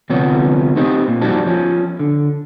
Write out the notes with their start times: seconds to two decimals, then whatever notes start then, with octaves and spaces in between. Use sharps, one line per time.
0.10 D2 C3 F3 B3 C#5
0.76 C4 D#4 G4 C5
1.08 A#2
1.21 F2 G3 D#4 F#4 C5 A5
1.46 F3 C#4
1.99 D3